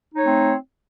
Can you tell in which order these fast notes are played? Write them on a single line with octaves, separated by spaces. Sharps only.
D#4 C#5 A3 C4